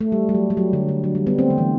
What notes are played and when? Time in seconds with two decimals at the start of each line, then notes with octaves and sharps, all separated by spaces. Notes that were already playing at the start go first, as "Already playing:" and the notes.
0.01 A3
0.12 G3
0.29 G3
0.35 F#3
0.50 G3
0.57 F#3
0.73 D3
0.88 D3
1.04 F#3
1.15 G3
1.27 G3 B3
1.39 A3 C4
1.50 D3
1.58 E3